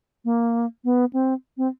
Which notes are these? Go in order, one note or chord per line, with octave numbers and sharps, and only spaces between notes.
A#3
B3
C4
C4